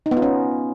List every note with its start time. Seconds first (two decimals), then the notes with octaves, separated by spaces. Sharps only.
0.06 D#4
0.11 B3
0.17 F4
0.22 C#4